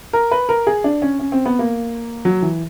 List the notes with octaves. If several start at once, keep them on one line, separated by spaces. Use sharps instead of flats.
A#4
B4
A#4
G#4
D4
C#4
C#4
C4
B3
A#3
F#3
E3